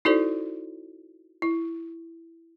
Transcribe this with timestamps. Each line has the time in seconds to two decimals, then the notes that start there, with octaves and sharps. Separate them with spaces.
0.05 D#4 E4 F#4 A4 C5 D5
1.42 E4